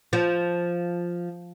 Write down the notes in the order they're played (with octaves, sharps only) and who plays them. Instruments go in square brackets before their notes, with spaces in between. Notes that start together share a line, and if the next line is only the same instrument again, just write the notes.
[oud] F3